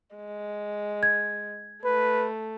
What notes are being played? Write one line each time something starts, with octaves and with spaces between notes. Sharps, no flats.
G#3
G#6
A3 B4